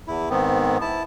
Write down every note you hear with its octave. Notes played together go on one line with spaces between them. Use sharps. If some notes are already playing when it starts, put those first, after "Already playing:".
E2 E4
G#2 D#3 B3 C4
E4 A5